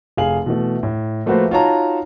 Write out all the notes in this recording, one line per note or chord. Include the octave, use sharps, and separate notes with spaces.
F1 G#4 F5 G#5 F#7
B2 E3 A3
A2
F3 A3 A#3 F#4 B4 C5
D#4 F4 F#4 C#5 A5 A#5